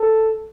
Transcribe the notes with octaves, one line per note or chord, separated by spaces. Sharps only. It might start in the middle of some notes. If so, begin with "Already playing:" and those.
Already playing: A4